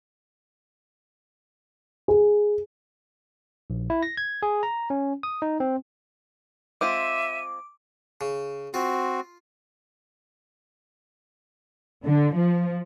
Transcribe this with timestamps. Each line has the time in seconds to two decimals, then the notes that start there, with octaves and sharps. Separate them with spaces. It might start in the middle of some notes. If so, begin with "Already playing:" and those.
2.08 G#4
3.70 A#1
3.90 E4
4.03 A#6
4.17 G#6
4.43 G#4
4.63 A#5
4.90 C#4
5.23 D#6
5.42 D#4
5.60 C4
6.81 G#3 C4 F4 E5 D6 D#7
8.21 C#3
8.74 C4 F4 F#4
12.06 D3
12.37 F3